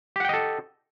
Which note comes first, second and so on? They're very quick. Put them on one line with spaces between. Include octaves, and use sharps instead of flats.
G4 F#5 G5 D#5 A4